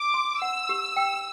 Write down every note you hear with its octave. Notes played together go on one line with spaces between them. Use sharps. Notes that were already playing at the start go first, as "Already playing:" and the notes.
Already playing: D6
C6
F#5 E6
G4
G5